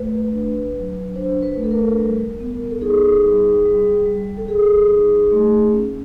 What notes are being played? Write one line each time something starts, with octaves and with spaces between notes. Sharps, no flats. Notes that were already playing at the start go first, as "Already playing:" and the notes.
Already playing: A3 B4
D4
F#3
D4 C5
B4
A3
A4
A#4
G3
B3
A4
D#4 G#4
G3
G3
G3
A4
G3 G#4
D#4
A3
C#4